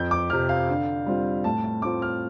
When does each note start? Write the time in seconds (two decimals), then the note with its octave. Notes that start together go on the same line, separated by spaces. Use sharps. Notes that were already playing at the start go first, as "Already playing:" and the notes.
Already playing: F2 G6
0.11 D6
0.30 C3 F3 F6
0.49 F5
0.69 D3
1.06 G3 C4 F4
1.44 A2 A5
1.64 A5
1.82 A3 C4 F4 D6
2.02 F6